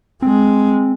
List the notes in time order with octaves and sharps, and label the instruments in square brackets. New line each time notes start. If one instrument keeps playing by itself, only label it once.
[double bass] G#3 [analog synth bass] C4